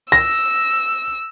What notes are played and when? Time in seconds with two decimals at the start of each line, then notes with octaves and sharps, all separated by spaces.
0.12 E6 A#6